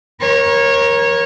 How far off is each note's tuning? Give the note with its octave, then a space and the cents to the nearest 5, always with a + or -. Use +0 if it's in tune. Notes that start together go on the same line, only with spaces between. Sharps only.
A#4 +20 C#5 -20